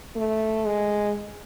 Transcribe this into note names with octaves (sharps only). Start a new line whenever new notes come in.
A3
G#3